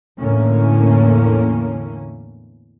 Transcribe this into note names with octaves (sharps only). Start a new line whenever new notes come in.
E2 A2 D3 A#3 C#4